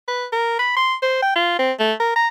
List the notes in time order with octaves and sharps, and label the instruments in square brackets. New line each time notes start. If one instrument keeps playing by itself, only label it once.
[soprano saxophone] B4
A#4
B5
C6
C5
G5
F4
C4
A3
A#4
A#5